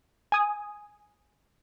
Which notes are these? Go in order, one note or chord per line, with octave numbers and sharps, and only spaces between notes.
G#5 D#6